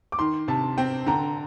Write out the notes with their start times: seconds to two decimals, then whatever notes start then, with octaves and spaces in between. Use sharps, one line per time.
0.12 D6
0.19 D#3 C6
0.48 C3 A5
0.77 C4 G5
1.07 D3 A#5